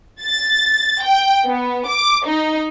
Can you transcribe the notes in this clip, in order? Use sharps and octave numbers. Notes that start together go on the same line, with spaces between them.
A6
G5
B3
D6
D#4